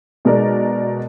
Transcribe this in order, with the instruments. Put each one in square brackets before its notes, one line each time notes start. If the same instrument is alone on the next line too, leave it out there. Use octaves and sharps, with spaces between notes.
[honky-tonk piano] B2 G#3 D#4 A#4 D5